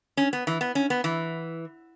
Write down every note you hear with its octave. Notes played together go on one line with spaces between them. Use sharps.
C#4
B3
E3
B3
C#4
B3
E3